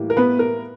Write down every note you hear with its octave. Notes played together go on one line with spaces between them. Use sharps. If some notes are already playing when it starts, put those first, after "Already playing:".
Already playing: A2 E3 G3 A#3
A#4
B3 B4
A#4